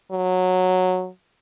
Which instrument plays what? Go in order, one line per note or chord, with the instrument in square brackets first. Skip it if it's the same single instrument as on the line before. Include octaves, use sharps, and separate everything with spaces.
[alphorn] F#3